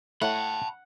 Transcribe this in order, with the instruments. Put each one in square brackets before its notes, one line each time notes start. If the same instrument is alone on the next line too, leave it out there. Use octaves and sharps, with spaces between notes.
[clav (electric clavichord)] A3 E4 C#5 [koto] F#5 [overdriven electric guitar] A5 B5